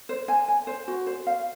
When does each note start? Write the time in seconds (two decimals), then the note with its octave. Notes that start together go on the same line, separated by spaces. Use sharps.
0.09 C5
0.28 G#5
0.48 G#5
0.67 C5
0.88 F#4
1.06 C5
1.27 F5